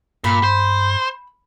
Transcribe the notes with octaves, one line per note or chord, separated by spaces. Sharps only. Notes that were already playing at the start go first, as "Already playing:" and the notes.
G2 A#2 B5
C5